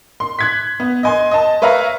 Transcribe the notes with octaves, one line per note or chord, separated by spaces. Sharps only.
C6
F#6 G#6 B6
B3
D#5 G#5 C6
D#5 A5
B4 C#5 E5 F5 A#5